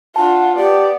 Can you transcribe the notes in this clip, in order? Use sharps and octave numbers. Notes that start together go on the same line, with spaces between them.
D4 F4 F#5 A5
B3 G4 D5